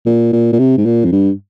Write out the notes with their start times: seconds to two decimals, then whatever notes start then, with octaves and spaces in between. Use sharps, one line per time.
0.06 A#2
0.33 A#2
0.52 A#2
0.59 C3
0.77 G#2
0.85 A#2
1.05 F2
1.12 G2